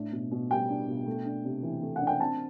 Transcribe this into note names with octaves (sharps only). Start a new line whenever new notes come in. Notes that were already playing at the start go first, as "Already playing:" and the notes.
Already playing: A2 D4
B2
B2
G3 G5
D4
B2
A3
D4
C3
E3
A3
F#5
D4
G5
C4 A5